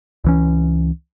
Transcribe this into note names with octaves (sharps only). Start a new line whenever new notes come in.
C#2 E3 C#4